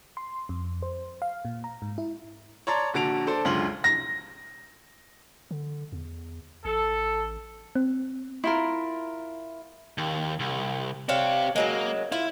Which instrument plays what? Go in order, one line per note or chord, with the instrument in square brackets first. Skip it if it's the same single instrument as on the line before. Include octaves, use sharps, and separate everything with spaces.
[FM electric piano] C6
F2
C5
F5
A#2
A#5
G#2
E4
[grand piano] C#5 D5 A5 A#5 C6 A6
A#1 D3 F#4 A5 D7 F7
D4 A4 C5 A5
C#2 F#2 D3 F4 C6 F#7
A#6
[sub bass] D3
E2
[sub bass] A1 [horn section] A4
[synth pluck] C4
[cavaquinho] E4 F4 A#4
[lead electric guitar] D#2
C2
[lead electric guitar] C4 G4 [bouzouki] D4 C#5 F5
[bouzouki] C#3 F#3 G#3 [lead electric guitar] A#3
[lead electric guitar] E4 [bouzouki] F4